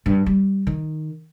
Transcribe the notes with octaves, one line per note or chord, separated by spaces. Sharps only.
G2
G3
D#3